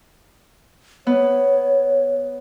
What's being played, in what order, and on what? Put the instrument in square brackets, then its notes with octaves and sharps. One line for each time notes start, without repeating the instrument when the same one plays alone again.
[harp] B3 [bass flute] C#5